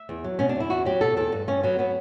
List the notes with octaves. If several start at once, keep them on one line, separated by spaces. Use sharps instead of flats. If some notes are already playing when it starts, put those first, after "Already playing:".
Already playing: E5
E2
F#3
B2 C#4
D4
E2 E4
E2 F#4
F#3 G4
B2 A4
E2 A4
G2
G2 C#4
F#3 B3
F#3 B3